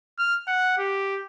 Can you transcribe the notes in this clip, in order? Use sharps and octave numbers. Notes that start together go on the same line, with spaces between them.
F6
F#5
G4